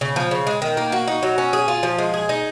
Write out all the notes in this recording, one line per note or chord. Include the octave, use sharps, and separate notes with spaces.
C#3
F3
C#3
G#3
D#3
A#3
F#4
D#4
F#3
C#4
G#4
F4
F3
G#3
G#4
D#4